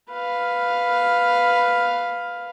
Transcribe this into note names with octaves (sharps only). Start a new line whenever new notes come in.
B4 F5